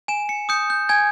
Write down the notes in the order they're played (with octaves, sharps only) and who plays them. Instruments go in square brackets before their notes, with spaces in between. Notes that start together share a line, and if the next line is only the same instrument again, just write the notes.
[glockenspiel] G#5 E7
C#7
D#6 G6 C#7
G6
G#5 G#6